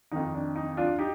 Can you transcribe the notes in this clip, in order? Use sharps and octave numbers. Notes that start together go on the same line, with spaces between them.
F2 D#3 D#4
D4
D#4
D4 F4
D#4 G4